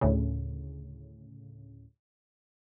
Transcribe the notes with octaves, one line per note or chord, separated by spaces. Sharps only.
D2 A2 C#3